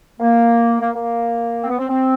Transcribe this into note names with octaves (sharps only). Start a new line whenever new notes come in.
A#3
A#3
A#3
C4
B3
C4
C4